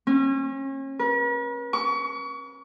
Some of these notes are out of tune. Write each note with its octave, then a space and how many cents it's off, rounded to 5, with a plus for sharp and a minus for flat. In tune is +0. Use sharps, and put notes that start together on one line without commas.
C#4 -35
B4 -45
C#6 +35